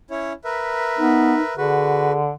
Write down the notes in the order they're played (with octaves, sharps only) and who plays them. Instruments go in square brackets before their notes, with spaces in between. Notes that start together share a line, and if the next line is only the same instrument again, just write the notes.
[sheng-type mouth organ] C#4 E4 C#5
A#4 B4 E5
[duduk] B3 [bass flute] D#4
[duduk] D3 [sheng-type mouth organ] F#4 B4 [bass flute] G#4